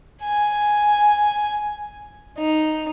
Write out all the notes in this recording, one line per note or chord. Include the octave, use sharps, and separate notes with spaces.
G#5
D#4